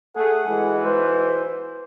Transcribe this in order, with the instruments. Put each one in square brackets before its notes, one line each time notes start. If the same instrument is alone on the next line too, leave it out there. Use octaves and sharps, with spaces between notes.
[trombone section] A3 G#4 [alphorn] A4 [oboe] F#5
[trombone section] B1 E3 [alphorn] G#3
[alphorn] B4 [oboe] C5